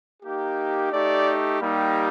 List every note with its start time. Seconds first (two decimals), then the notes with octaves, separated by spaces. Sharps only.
0.23 A#3 D#4 G4
0.92 A3 D#4 G4 D5
1.60 G3 A#3 D#4 G4